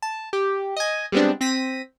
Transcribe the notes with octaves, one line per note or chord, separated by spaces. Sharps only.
A5
G4
D#5 G#5
G3 G#3 B3 C4 D4
C4 A#6 B6 D#7